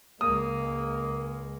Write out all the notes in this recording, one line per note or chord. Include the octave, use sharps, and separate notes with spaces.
C#2 G#3 A#3 D#6